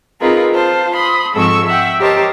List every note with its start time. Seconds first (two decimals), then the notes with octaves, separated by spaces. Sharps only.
0.20 C4 D#4 F4 G#4 A#4 B4
0.52 F4 C5 F5 A5
0.95 B5 C6 D#6
1.33 G#2 F3 C4 A4 C#6 E6
1.67 E5 F#5 G5
1.99 G4 A#4 C5 C#5 D#5 A5